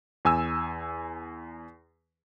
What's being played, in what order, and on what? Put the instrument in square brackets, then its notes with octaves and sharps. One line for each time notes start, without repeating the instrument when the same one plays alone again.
[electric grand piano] E2 G#5 E6